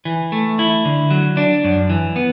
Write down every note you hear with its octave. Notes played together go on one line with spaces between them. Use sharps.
E3
A3
E4
D3
F#3
D4
F#2
E3
B3